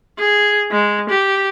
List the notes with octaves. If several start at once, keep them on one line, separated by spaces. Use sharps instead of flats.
G#4
G#3
G4